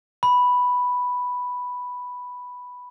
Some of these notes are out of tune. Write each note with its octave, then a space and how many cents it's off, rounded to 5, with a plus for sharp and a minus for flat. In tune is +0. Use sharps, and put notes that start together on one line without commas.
B5 +0